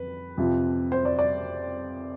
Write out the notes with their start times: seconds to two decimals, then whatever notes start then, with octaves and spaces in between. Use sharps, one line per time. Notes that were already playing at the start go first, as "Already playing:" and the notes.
Already playing: F2 B4
0.38 F2 C3 F3
0.92 C5
1.05 D5
1.19 D5